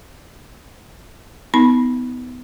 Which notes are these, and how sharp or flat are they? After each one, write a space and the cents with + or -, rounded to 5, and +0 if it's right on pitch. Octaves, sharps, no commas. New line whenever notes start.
B3 +20 D#4 +35 B5 -15